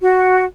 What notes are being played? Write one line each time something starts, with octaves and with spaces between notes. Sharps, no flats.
F#4